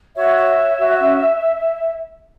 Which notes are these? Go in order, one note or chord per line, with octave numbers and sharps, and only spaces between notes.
F#4 C#5 E5
C#5
C#5
F#4
C#4